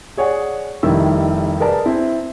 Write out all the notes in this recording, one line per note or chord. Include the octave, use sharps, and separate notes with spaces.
G#4 C#5 D5 F#5 G#5
F1 D#3 G3 E4 E6
G#4 A#4 B4 D5 A5
C4 E4